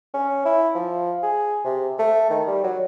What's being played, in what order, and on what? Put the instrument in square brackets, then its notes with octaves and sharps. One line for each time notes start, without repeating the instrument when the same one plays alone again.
[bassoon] C#4
E4
F3
G#4
C3
A3
D#3
G3
F#3